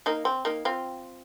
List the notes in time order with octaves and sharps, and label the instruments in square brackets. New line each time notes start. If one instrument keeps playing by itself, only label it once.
[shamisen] A#3 D#4
C4
A#3 D#4
C4 F4